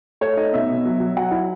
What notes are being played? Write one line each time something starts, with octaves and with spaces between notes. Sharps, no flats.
A3 C#5
D#4 D#5
B2 E5
B2
F#3
F#3
F#3 F#5
E4